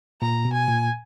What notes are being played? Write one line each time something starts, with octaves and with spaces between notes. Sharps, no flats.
A#2 A#5
B2
G#5
A#2